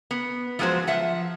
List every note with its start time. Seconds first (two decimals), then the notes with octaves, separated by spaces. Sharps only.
0.11 B3
0.59 F3 F#3 G#3 F#4 C5
0.87 F3 E5 F#5